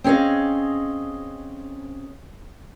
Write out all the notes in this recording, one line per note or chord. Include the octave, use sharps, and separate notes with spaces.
C4 C#4 G#4 D#5 F5